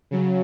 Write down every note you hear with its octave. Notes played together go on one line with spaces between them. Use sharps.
C#3 F#3